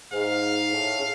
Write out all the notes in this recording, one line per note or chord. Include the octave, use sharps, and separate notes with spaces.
G#2 F5
A2
C#3